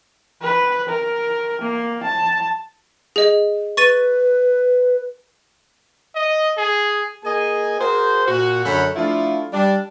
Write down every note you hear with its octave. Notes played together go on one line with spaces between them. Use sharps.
B4
A#4
A#3
A5
G#4 D#5
B4 C#6 A6 D#7
D#5
G#4
A#3 G#4 A#4 D#5 G#5
F#4 G#4 A#4 C5
A#2 F#4
F#2 D3 C#4 A4 F#5 B5
F3 A3 D4 E4 F4
G3 D4